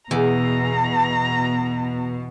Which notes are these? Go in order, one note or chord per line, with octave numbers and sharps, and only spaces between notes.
E2 B2 A#5